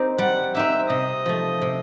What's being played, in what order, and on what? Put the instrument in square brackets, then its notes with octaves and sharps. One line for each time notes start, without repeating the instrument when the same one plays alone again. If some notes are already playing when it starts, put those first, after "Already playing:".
Already playing: [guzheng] C4 D#4 G4
[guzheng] G3 [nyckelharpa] F#5
[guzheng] C4 D#4 G4 [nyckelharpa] E5
[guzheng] C3 [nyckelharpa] D#5
[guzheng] F3 A3
C3